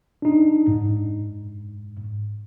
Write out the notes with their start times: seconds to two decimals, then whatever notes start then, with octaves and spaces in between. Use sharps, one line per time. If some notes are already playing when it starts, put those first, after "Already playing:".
0.22 D4 D#4
0.68 G#2